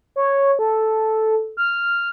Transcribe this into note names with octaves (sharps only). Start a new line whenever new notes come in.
C#5
A4
F6